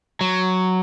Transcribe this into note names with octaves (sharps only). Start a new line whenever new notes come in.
F#3